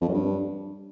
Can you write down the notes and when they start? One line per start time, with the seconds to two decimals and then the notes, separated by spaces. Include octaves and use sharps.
0.01 F2
0.08 F#2
0.14 G2